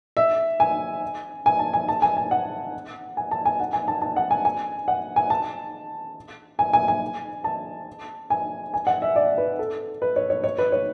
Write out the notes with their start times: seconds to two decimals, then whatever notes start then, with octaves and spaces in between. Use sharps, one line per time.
0.17 E5
0.60 G#5
1.46 G#5
1.59 A5
1.73 G#5
1.88 A5
2.02 G#5
2.17 G#5
2.31 F#5
3.17 G#5
3.31 A5
3.45 G#5
3.60 F#5
3.73 G#5
3.88 A5
4.02 A5
4.16 F#5
4.31 G#5
4.45 G#5
4.88 F#5
5.16 G#5
5.30 A5
6.59 G#5
6.73 G#5
6.88 G#5
7.44 A5
8.30 G#5
8.74 G#5
8.87 F#5
9.02 E5
9.16 D5
9.38 B4
9.59 A4
10.02 B4
10.16 C#5
10.30 C#5
10.44 C#5
10.58 B4
10.72 C#5